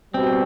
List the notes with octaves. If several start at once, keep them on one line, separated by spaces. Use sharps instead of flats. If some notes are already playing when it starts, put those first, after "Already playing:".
B2 G3 C4